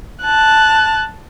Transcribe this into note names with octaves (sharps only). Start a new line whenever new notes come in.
A5 F#6